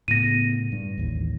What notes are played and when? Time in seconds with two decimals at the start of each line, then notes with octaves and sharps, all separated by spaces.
0.08 A2 C#3 B3 A#6 D#7
0.72 G2
0.98 A1 D#2